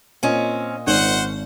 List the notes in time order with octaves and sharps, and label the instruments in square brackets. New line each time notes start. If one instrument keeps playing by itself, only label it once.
[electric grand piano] A#2 D#5 [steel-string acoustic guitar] C4 C#4
[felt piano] G#1 [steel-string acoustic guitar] C#4 [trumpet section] C5 F#5